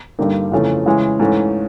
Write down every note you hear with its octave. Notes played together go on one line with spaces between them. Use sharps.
G2 D3 G3 A#3 D#4
F2 C#3 E3 A3
C#3 E3 G#3
G#2 E3 A3 C#4